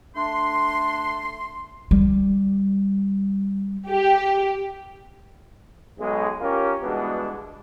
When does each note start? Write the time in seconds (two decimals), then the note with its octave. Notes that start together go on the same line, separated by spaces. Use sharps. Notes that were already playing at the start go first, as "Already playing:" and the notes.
0.15 A3 D4 C6
1.91 G3
3.89 G4
5.99 B1 G#3
6.41 C#4 F4 G4 A#4
6.82 G2 B2 E3 G#3 D4 B4